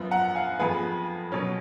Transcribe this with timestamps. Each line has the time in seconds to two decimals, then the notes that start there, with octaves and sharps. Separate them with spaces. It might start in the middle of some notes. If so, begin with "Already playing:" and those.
Already playing: F#2 F3 B3
0.11 F#5 A#5
0.35 F5 G#5
0.59 F2 F3 B3 G#4 B4
1.32 B2 F#3 C#4